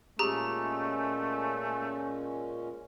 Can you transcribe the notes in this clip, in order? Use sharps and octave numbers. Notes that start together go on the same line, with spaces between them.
A#2 G#3 A3 C#4 G4 G#4 A#5